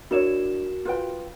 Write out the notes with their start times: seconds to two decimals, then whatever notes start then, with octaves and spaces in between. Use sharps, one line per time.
0.11 D4 E4 F#4 A#4 C#5 E7
0.85 F4 B4 G5